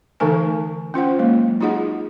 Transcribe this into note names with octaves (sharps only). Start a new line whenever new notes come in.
D3 E3 A3 D#4 A#4 G#5
C#4 F4 C5 F#5
F#3 G#3 A#3
D#4 F4 F#4 G#4 D#5 F#5